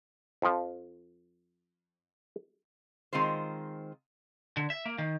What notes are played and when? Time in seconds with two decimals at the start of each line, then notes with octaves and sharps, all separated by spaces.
0.42 F2 F3
3.13 D#3 G#3 C4 F4 C5
4.57 D3
4.70 E5
4.86 A#3
4.98 D#3